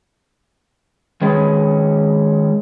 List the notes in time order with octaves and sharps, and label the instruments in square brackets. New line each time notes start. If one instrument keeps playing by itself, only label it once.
[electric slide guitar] D#3 G#3 C#4 B4